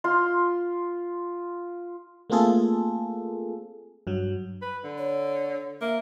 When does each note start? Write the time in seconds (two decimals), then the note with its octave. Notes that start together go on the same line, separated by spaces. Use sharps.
0.04 F4 C6
2.30 A3 A#3 C4 F4 G#4 A4
4.07 G2 F#3
4.62 B4
4.84 D3
4.98 C#5
5.81 A#3 E5